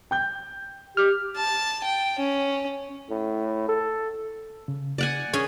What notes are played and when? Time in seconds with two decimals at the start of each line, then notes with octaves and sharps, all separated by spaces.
0.11 G5 G6
0.97 G4 F6
1.36 A5
1.84 G5
2.19 C#4
3.10 A2
3.69 A4
4.68 C#3
4.98 D5 F#5 G#5
5.33 C#4 G#4